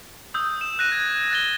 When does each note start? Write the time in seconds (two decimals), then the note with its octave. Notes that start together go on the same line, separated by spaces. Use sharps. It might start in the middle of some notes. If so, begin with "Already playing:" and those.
0.34 D#6 E6 G6
0.61 E7
0.79 F#6 A#6 D#7
0.92 G#6
1.31 F#6 A6 G7